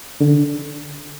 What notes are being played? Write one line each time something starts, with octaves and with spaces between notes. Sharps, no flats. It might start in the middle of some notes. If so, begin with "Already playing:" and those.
D3